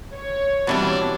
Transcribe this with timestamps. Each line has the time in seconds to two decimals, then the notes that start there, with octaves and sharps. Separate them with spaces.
0.13 C#5
0.67 B2 E3 G3 C4 D4